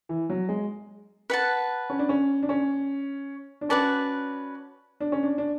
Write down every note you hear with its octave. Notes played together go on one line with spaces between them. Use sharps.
E3
F#3
G#3
B4 F#5 A5
C#4
D4
C#4
D4
C#4
D4
C#4 F#4 B4 D5 A5
D4
C#4
D4
D4